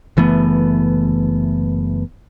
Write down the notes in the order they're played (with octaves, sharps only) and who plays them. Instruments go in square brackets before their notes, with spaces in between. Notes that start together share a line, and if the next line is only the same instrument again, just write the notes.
[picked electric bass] F#1 E3 A3 B3